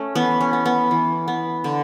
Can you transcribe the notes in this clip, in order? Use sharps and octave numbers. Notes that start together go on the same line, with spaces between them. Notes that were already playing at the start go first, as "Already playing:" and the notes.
Already playing: A3 C#4
E3 B3
C#4
B3
B3
E3
B3
D3